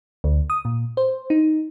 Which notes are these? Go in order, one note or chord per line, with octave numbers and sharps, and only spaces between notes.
D2
D#6
A#2
C5
D#4